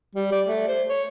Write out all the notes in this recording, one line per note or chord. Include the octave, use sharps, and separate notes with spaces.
G3
D5
A3
C5
C#5